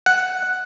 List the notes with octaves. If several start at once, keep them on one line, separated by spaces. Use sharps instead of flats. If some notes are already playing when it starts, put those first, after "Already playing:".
F#5